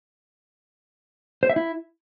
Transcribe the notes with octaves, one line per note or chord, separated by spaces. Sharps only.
C5
E5
E4